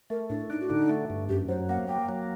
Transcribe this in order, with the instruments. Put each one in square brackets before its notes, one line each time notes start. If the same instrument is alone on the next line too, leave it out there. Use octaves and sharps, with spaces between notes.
[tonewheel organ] A3 [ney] A#4
[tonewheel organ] A2 [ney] D4
[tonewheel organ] D4 [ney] D#4
[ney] F#4
[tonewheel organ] D3 [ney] D#4
[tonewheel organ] A3
G2
[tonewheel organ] F#2 [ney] G4
[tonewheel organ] F#3 [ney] C5
[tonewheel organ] A#3 [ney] F#5
[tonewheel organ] A#3 [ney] G5
[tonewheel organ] F#3